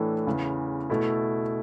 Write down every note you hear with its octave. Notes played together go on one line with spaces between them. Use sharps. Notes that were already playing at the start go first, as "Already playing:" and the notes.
Already playing: A2 E3 A3 D4 A4
E2 C#3 E3
B2 A3 E4 A4